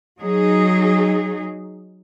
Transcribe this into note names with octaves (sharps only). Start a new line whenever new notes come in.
F#3 D#4 G#4